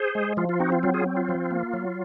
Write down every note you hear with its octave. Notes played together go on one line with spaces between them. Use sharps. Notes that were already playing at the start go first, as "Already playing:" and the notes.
Already playing: G#4 C5
G#3
F3 F4
F4
C4 D#4 F#4
F4
F#3 F4
F4 G#4
C4
F4
F3
A#3
F#3